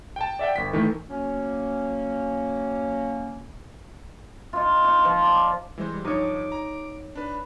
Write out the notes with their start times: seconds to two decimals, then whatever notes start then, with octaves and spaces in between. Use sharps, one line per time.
0.16 G5 A5
0.39 D5 E5 F#5 G5
0.56 G1 B6
0.73 D#3 E3 A3
1.10 F#3 A#3 C#4
4.53 D#4 F4
4.84 D#4
5.05 F3
5.23 D5
5.78 E3 G3 G#3 C5
6.05 G2 F3 D#4 C#5 D6
6.52 A#5
7.16 D4 B4 B5